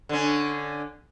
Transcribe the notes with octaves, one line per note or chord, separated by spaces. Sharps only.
D3 C#4